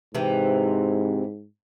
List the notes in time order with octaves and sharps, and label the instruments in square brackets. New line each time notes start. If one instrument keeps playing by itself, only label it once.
[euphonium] G#2 [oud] C3 E3